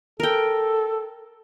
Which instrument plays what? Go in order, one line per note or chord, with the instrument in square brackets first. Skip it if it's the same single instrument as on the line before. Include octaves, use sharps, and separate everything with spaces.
[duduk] A4 [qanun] A#4 G5